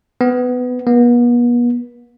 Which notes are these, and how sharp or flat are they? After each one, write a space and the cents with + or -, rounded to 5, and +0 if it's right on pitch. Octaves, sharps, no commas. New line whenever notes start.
B3 +15
B3 -40